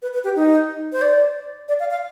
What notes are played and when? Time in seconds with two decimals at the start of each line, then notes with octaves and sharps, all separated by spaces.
0.02 B4
0.13 B4
0.24 G4
0.36 D#4
0.93 C5
1.02 D5
1.68 D5
1.80 F5
1.91 F5